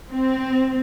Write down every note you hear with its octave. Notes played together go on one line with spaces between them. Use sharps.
C4